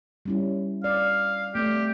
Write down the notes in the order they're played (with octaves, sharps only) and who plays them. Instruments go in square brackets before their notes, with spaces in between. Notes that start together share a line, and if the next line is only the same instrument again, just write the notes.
[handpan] G3 C#4 E4
[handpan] D5 [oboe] F5
[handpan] A3 C4 D5 [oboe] G4